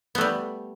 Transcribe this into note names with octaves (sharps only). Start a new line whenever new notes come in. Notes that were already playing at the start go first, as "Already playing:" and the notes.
G3 A3 B3